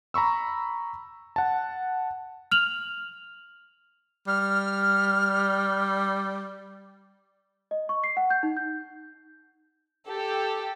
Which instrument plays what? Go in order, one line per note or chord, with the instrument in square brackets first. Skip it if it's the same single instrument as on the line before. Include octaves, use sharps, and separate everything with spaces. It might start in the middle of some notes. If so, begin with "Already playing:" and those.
[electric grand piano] A#5 B5 C#6 E6
F#5 A5
[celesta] F6 F7 F#7
[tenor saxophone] G3 [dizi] F6
[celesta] D#5
C#6
C7
F#5
G6
D#4
G6
[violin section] G4 A4